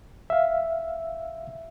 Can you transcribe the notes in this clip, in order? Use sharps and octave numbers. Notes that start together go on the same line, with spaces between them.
E5 F5